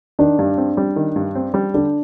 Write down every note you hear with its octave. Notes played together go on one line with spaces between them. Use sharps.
D#3 D4
G2
C4
G3
D#3
G2
C4
G3
D3 D4